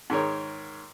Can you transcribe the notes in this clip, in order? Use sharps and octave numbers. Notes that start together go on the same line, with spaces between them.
G#2 D#3 A#4 C#5